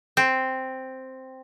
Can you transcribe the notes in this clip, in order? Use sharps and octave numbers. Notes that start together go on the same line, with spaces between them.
C4